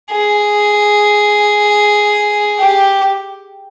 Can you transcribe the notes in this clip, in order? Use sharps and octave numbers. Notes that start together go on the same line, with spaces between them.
G#4
G4